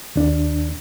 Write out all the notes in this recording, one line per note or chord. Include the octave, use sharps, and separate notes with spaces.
D#2 D4